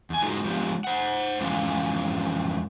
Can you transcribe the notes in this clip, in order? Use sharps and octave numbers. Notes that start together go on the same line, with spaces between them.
E2 G#5
F#3 G#3 D#4 F4 G#4
F3 G#3 B3 D4 F4 G4
C5 F#5
F2 E3 G#3 C#4 F4